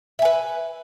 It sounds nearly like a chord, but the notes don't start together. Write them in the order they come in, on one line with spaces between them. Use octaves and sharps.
E5 G#5 B4